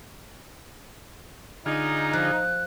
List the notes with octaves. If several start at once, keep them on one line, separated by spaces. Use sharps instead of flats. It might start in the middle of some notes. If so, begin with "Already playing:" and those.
D3 D#4 F4 G#4
F3 F#6